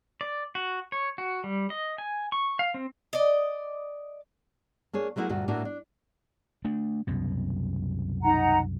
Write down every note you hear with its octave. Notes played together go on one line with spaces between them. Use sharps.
D5
F#4
C#5
F#4
G3
D#5
G#5
C#6
F5
C4
D5 D#5
A#3 D4 G#4 C#5
F#3 A3 A#3 E4 F#4 G#4
D2 G2 A#2 F#4
A2 A3 A#3 D4 F#4
D4
A3 D4
C2 F#2 B2
D#4 F#5 A#5